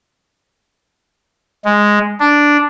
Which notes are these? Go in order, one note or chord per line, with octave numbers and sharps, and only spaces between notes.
G#3
D4